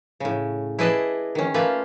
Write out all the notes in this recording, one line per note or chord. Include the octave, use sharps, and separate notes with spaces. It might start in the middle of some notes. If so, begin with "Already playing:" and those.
A2 C#3
E4 G#4 B4 D5 D#5 A5
D#3 C#4
A3 A#3 F4 B4